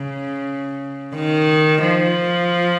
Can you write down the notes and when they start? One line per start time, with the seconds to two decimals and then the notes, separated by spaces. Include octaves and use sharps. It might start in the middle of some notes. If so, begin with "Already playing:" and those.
Already playing: C#3
1.15 D#3
1.83 F3